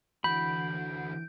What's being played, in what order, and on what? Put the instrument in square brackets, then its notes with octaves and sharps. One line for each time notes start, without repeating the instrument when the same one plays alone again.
[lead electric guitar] D3 F#4 [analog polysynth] E3 D7 [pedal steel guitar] B5 [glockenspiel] G6